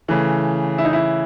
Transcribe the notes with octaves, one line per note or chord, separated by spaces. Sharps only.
C#3 E3 A3
E4
D#4
E4